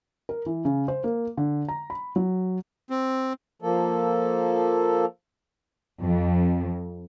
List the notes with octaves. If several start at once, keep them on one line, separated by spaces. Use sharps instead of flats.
A#4
E3
C#3
C5
A#3
D3
A#5
B5
F#3
C4
F3 A#3 A4
F2